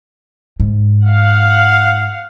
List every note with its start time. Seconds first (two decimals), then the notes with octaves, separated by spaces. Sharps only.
0.60 G#2
1.06 F5 F#5